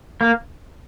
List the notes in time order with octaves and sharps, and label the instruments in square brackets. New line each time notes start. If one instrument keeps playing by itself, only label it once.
[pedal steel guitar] A#3